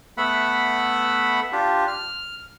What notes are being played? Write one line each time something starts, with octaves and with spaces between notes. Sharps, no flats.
A3 B3 E5 F#5 B5
D4 F4 G4
F6